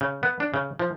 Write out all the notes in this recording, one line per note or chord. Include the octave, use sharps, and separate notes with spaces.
C#3
B3
D4
C#3
F3